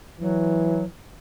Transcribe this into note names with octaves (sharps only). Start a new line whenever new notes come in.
E3 F#3